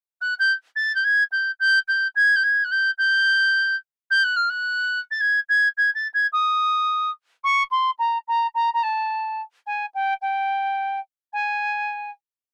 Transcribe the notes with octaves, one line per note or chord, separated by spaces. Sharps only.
F#6
G6
A6
G6
G#6
G6
G6
G6
G#6
G6
G#6
F#6
G6
G6
G6
F#6
F6
F#6
A6
G#6
G#6
G#6
A6
G#6
D#6
C#6
C6
A#5
A#5
A#5
A#5
A5
G#5
G5
G5
G#5